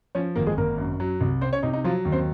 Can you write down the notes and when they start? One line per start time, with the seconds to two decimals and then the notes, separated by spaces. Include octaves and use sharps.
0.15 F3 C#4 C#5
0.36 G#1 A#3 A#4
0.47 G#3 G#4
0.57 G#1 A#3 A#4
0.78 F#2
1.00 F#3
1.21 C2
1.41 C4 C5
1.53 C#4 C#5
1.63 C3 D#4
1.73 D#4
1.84 F3 F#3 F4
2.05 D#2
2.12 C4 C5